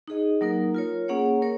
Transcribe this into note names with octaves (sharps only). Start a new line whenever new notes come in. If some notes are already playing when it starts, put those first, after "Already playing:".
D#4 G#4 D#5
F#3 A#3 D#4 A#4
F4 A#4 C#5
A#3 C#4 G#4 C#5 F#5
A#4 C#5